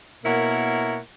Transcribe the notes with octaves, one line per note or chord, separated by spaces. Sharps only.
B2 A#3 E4 A#4 C#5 F#5